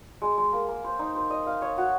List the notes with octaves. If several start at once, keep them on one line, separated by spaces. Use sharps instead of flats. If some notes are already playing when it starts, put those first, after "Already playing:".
G#3
G#3
A#3
A#3
C5
D#4
C5
D#5
F5
C#5
F#4